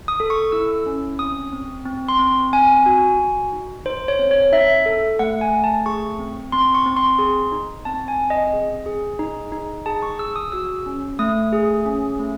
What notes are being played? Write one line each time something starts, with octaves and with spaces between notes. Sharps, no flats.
D#6
A4
C#6
E4 E6
C#4
C4 D#6
C4
C4
C6
C4
C4 G#5
F#4
F#4
D#4
D#4 C5
C#5
C4
C#5
D#4 E5
A4
A3 F#5
G#5
A3
A5
G#4 C#6
C4
C4 C6
C#6
C4
C6
G#4
D#4
C4 A5
G#5
C4
D#5
G#4
G#4
D#4
D#4
G#4 A5
C#6
G#4 E6
D#6
F#4 E6
C#4
A3 D#6
G#4
C#4
A3